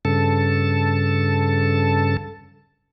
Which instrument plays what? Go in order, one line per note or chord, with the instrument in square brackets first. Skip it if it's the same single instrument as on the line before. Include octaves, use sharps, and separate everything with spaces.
[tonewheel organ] G2 C#3 A4 A5